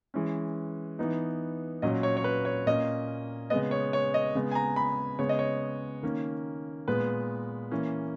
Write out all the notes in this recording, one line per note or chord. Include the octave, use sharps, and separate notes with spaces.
E3 G#3 C#4
E3 B3 D#4
A#2 F#3 C#4 D#5
C#5
C#5
B4
C#5
A#2 A#3 C#4 D#5
C#3 G#3 B3 D#5
C#5
C#5
D#5
C#3 G#3 B3
G#5
A#5
B5
C#3 G#3 B3 C#5
D#5
C#5
D#3 A#3 C#4
A#2 G#3 B3 B4
E3 A#3 C#4